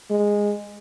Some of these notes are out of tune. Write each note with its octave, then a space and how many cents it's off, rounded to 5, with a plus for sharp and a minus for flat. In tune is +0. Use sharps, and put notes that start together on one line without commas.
G#3 -10